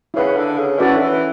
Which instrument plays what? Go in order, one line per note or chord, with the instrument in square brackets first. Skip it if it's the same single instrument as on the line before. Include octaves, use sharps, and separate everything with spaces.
[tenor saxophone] C#3 [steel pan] E4 B4 F#5
[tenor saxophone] D3
C#3
[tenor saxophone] E3 [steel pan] C#4 F#4 A4 D5
[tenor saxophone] D3
E3